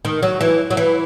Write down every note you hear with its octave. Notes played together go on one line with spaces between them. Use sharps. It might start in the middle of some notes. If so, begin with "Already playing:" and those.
D#3
F#3
E3
F#3
E3